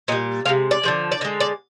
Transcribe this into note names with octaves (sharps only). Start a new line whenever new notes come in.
A#2 G3 D#5
C3 F3 G#3 F5
D5
D3 F3 G#3
D5
D3 G#3 D#5
D5